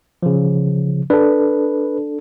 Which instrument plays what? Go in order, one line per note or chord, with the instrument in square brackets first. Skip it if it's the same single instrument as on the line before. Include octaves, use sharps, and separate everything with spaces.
[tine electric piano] C#3 F3
[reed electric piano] D4 A4 [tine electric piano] B4